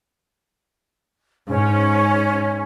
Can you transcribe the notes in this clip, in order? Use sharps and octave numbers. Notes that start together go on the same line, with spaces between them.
G#2 C#4